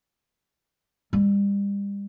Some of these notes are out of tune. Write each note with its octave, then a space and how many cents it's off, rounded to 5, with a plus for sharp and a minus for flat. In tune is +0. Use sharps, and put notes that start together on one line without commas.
G3 +35